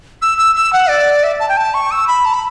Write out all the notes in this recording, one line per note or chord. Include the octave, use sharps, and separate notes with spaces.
E6
E6
E6
F#5
D5
E5
A5
G5
A5
C#6
E6
B5
A5
B5